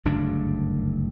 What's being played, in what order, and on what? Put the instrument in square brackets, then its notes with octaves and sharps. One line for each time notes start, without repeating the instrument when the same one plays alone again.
[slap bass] F#1 D2 G2 D4